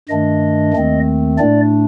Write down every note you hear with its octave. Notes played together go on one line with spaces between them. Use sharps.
G2 D#3 A3 D4 D#5
D#2 D#3 A3 C4
A2 A3 D4 D5